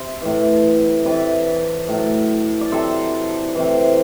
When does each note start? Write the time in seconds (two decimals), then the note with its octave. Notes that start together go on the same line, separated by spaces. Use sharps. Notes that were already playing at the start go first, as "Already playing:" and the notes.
Already playing: C3 C5 E5
0.22 A2 E3
1.05 C3 E3 B4 D5
1.89 A2 F#3
2.61 D5
2.72 C3 F#3 A4 C5
3.55 C3 E3